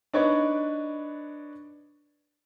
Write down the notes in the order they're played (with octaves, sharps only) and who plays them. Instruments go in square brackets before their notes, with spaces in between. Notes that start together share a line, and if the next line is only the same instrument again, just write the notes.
[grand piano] D4 D#4 B4 C#5 D5